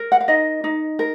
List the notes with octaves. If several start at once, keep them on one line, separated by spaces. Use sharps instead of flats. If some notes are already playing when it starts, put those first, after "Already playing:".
Already playing: A#4
F#5
F5
D#4 D#5
D#4
A#4